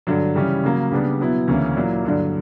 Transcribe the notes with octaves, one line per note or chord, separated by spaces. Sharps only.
G2 D3 F#3
C#3 E3 G3 C#4
C#3 F#3 A#3
C#3 G3 B3 D4
B2 F#3 B3 E4
D2 C#3 E3 A#3 C#4
A#2 F#3 A#3 E4
G2 D3 F#3